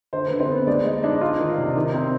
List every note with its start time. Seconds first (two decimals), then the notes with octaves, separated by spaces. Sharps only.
0.13 D3 C5
0.26 D3 B4
0.40 C4 C5
0.49 B3
0.67 G#3 D4 D5
0.85 G#3 D#4 D#5
1.03 D4 D#4 D#5
1.21 F4
1.39 D#3
1.58 C3
1.76 D#3
1.94 C4